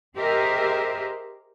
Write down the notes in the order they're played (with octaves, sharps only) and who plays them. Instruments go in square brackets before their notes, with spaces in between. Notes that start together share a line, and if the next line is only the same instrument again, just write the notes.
[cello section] G4 G#4 A#4 C5 D#5 E5